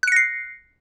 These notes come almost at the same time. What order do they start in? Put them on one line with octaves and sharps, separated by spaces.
F#6 C#7 A#6 C7